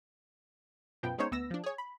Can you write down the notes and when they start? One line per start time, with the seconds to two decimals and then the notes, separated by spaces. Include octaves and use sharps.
1.03 F#2 B2 F3 B3 G5
1.18 G#3 B3 C#4 D#4 C5 C#5
1.31 D2 B3 E6 A#6
1.51 F3 D4
1.64 G#4 C#5
1.78 B5